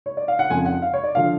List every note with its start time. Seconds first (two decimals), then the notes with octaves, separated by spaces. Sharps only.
0.06 C#5
0.17 D5
0.28 F5
0.39 F#5
0.49 F2 C#3 F3 G#5
0.66 F#5
0.82 F5
0.93 C#5
1.04 D5
1.15 D3 F3 F5